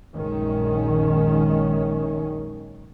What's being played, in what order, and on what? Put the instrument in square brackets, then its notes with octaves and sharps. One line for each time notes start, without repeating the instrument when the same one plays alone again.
[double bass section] A#1 F#2 D#3 G#3 C#4